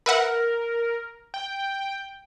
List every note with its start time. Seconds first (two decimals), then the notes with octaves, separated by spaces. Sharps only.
0.06 A#4 B4 E5 F#5
1.34 G5